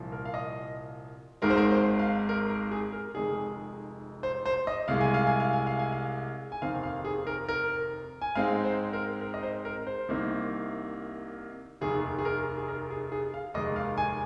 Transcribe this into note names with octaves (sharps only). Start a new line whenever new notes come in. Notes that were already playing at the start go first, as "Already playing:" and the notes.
Already playing: C2 A#2 F3
A#4
F5
D#5
G#1 G#2 D#3 G#3 A#4
C5
A#4
C5
F5
A#4
A#4
G#4
A#4
F1 F2 D#3 G#3 G#4
C5
C5
D#5
C2 C3 G#3 F5
G#5
F5
G#5
F5
G#5
F5
G#5
F5
G#5
F1 D#2 D#3 C4 F5
F5
G#4
A#4
A#4
G#5
G#2 G#3 C4 D#4 F5
C5
A#4
A#4
D#5
C5
A#4
C5
C2 C3 D#3 A#3 D#4
F1 D#2 D#3 G#4
G#4
A#4
G#4
A#4
G#4
G#4
F5
F1 D#2 D#3 G#3 D#5
F5
G#5